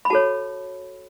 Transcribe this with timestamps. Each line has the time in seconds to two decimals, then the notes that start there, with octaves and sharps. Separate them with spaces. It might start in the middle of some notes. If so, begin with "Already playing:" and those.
0.05 B5
0.10 F#4 A4 C#5 A5